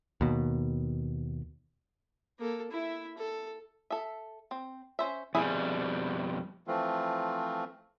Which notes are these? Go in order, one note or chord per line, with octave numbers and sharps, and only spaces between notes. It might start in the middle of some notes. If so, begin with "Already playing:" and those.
D#2 B2
A#3 A4
E4 E5
A4
A4 E5
C4
C#4 C5 E5
F2 B2 G3 E4 G#4 E5
E3 F3 A3 C4 F4